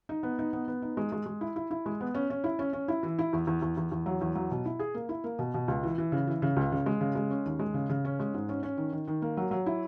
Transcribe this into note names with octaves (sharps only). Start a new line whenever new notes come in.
D#4
B3
D#4
B3
B3
D#4
G#3
G#3
G#3
E4
E4
E4
G#3
B3
C#4
C#4
E4
C#4
C#4
E4
E3
E4
E2
E2
E2
E2
E2
F#3
E2
F#3
B2
E4
G#4
A#3
E4
A#3
B2
B2
C#2
E3
E3
C#3
E3
C#3
C#2
C#3
G#3
C#3
G#3
C#4
D#2
G#3
C#3
C#3
C#4
G#3
G#2
C#4
C#4
D#3
D#3
D#3
A#3
F#3
F#3
E4